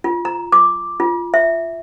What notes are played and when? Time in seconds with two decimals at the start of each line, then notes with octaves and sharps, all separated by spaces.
0.04 F4
0.25 A#5
0.52 D6
1.00 F4
1.34 E5